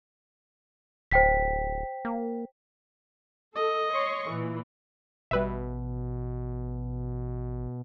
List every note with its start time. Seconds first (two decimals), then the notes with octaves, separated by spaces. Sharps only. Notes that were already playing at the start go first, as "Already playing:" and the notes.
1.11 D1 C5 G5 B6
2.05 A#3
3.56 A4 D#5
3.93 C#5 C6 C#6
4.30 A#2 E3
5.31 A1 B2 G3 B4 E5